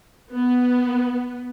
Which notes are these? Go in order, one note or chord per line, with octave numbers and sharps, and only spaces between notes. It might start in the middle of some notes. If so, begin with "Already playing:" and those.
B3